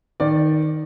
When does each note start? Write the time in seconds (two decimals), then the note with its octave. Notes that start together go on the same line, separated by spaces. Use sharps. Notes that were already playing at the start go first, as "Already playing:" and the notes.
0.20 D#3 D5